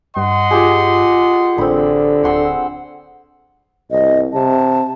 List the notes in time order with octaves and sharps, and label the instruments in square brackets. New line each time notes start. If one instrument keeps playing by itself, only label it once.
[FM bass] G2 [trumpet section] D#5 F#5 C6
[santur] F4 G4 G#4
[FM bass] A1 [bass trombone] D3 [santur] C4 B5
[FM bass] D1 [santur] F#5 C6 E6
[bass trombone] C2 [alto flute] D#5
[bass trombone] C3 [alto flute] A5